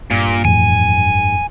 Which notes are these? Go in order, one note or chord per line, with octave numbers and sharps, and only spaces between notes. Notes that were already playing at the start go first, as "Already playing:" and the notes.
G2 A#2
F2 A2 E3 G#5